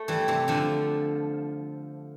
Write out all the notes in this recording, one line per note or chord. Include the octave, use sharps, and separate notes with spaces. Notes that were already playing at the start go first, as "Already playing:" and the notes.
Already playing: A3
E3 G3
C3 E3
D3 F3